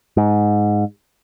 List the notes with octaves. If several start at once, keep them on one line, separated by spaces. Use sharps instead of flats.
G#2